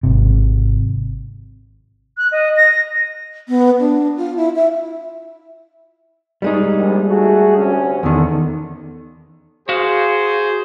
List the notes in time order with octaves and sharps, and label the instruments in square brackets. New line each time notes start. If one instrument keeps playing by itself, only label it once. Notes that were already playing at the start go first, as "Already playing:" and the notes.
[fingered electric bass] G#1 C3
[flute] F#6
D#5
A#6
[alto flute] B3
D4
F4
E4
E5
[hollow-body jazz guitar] G3 G#3 D#4
[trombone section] A#1
A3 F#4 G#4
D2 C3 C#4
[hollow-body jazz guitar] E2 D#3 [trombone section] D3
[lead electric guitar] F#4 F5 [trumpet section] G#4 C5